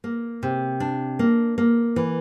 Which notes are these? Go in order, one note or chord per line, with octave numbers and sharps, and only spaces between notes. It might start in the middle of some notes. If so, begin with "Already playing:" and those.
A#3
C3
D4
A#3
A#3
E3